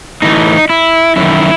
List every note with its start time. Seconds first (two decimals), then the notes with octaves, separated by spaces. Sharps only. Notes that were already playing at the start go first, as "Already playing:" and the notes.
0.22 A2 E3 D#4
0.69 E4
1.16 F#2 D#3 E4